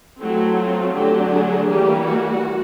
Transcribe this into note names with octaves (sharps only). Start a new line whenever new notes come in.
F#3 A3 C4 E4
F4
D3 F#3 A3 D4 G4
G#4
E3 G3 A#3 G4
F#4